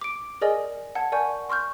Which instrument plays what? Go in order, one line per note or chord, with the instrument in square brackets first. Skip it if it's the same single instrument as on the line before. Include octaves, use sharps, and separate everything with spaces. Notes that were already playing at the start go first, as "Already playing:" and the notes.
[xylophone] D6 D7
G#4 A#4 D5 D#5 G#5
F#5 A5 G#6
A#4 D5 F#5 G#5 C#6 G6
C6 C#6 F6 G6